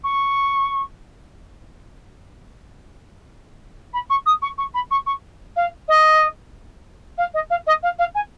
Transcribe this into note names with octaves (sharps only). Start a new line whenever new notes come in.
C#6
B5
C#6
D#6
C#6
C#6
B5
C#6
C#6
F5
D#5
F5
D#5
F5
D#5
F5
F5
G#5